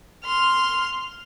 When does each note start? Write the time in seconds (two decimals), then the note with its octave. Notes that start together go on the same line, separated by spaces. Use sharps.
0.24 C6 F6